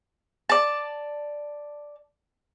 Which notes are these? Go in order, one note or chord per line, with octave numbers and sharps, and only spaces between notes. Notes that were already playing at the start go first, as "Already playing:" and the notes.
D5 A5